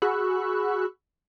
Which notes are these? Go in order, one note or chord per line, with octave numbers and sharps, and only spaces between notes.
F#4 G#4 B5 C#6 E6 F#6